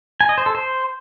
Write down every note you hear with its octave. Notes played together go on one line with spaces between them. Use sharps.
G#5
D#5
C5
A4
C5